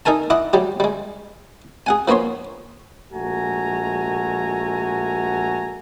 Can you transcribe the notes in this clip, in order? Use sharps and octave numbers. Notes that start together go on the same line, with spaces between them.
D#4 A4 A#4 G#5 A5
E4 D#5 F#5 D6
F#3 G3 G4
G3 G#3
G#4 F#5 G#5
F3 A#3 B3 C#5 C6
A#1 G#3 A3 F#4 G#5 A#5